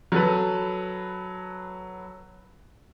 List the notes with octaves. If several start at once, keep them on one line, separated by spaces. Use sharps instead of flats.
F#3 A4 B4